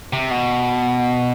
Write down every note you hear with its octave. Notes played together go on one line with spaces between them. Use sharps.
C3
B2